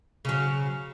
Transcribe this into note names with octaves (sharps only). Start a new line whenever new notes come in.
C#3 F#3